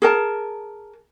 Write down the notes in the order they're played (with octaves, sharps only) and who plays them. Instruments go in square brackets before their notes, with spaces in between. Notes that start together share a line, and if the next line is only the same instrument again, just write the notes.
[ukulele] G#4 A#4 A5